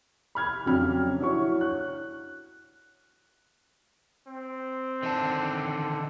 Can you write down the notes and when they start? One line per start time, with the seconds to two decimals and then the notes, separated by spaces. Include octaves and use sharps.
0.35 B5 F6 G#6
0.66 F2 C#3 F#3 C#4 D4 F6
1.20 D4 E4 F#4 C#5 C#6
1.61 F#6
4.28 C4
5.03 D3 D#3 A5